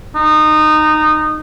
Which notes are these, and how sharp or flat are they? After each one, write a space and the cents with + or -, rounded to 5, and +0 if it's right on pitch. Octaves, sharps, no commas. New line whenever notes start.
D#4 -20